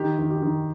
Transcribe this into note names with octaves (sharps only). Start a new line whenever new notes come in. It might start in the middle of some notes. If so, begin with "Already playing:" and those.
Already playing: D#3 G4
D#3
G4
D#3